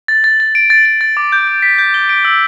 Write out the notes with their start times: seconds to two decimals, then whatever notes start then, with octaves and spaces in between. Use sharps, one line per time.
0.08 A6
0.24 A6
0.40 A6
0.55 D7
0.70 A6
0.85 A6
1.01 A6
1.17 D6
1.32 G6
1.48 G6
1.62 B6
1.78 G6
1.94 G7
2.09 D7
2.25 E6